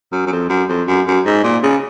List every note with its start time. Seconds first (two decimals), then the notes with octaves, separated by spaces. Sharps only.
0.12 F#2
0.27 F#2
0.32 F2
0.50 F#2
0.69 F2
0.88 F#2
1.07 F#2
1.26 G#2
1.44 A#2
1.63 C#3